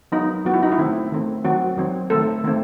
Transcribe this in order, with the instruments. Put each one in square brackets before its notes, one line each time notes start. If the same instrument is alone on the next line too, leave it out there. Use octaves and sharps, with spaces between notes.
[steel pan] F#3 B3 D#4
F#3 B3 F#4
E4
D#4
E4
D#3 A3 C4
D#3 A3 C4
D#3 F#3 C4 F#4
D#3 F#3 C4
D#3 A3 C4 A4
D#3 A3 C4